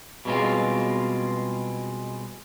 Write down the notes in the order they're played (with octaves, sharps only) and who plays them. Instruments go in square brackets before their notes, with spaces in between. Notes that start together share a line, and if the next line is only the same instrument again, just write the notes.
[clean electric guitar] B2 G3 G#3 C4 F4